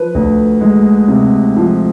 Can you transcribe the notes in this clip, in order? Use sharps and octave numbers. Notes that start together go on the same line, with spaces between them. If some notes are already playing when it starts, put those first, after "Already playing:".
Already playing: F3 B4
D2
G#3
C3
F3